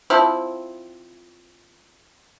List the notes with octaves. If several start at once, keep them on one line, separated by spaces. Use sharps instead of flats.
F3 C4 E4